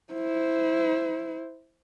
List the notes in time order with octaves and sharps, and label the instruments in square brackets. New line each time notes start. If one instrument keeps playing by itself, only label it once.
[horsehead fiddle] E4 C5